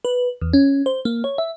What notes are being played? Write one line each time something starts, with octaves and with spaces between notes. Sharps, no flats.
B4
E2
C#4
C5
A#3
C#5
E5